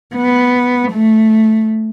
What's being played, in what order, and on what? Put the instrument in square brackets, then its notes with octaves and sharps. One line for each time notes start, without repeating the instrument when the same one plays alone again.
[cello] B3
A3